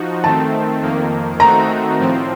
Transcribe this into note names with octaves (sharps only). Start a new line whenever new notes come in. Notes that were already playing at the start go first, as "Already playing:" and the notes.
Already playing: F3 D#4 F#4
D#3 A3 C4 A5
F2 D#3 A#3
D#3 A3 C4 D#4 F#4 A#5
A2 F3 C4